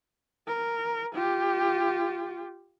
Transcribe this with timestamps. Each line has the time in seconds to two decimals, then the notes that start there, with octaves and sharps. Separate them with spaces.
0.48 A#4
1.14 F4 G4